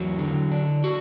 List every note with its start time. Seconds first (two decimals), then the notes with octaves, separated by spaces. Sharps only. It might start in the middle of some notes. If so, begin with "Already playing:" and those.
Already playing: E2 F#3 E4
0.18 D3
0.52 D4
0.84 F#4